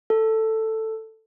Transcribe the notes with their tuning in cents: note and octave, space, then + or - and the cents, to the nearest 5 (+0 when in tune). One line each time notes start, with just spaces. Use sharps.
A4 +10